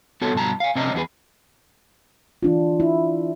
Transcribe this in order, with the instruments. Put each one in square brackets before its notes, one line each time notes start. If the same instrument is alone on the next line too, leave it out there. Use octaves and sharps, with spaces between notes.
[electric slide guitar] B3 F#4 A4 C#5 A5
G2 B2 F#3 A5 A#5
F5 G#5
C3 C#4 D4 C5 D#5 A#5
E2 B3 D4 G#4 B4
[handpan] E3 D4 F4
E4